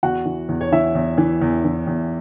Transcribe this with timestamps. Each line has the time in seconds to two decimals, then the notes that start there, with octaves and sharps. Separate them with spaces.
0.03 E2 F#4 F#5
0.25 E3
0.49 E2
0.61 C#5
0.72 E3 E4 E5
0.95 E2
1.18 E3
1.42 E2
1.64 E3
1.87 E2